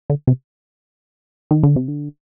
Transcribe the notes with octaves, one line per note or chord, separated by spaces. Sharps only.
D3
C3
D#3
D3
C3
D3